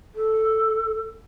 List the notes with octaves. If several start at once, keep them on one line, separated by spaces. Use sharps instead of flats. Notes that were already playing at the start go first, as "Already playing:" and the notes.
A4